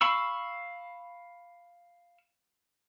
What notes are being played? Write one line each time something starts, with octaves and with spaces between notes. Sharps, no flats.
F5 B5 C#6 E6